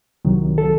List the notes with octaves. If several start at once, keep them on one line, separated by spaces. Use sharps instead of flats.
C2 C3 D#3 F#3
A4